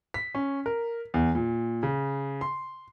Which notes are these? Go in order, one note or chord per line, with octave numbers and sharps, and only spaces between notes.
B6
C#4
A#4
E2
A#2
C#3
C6